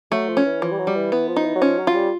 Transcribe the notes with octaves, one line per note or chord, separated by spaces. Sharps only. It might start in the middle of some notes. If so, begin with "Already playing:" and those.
F#3 A3
F3
C#4
E3
E3 F3
G3
F#3
G3
E3
E3 B3
F3
D#4
E3
F#3
F3 C#4
F#3
F4
G3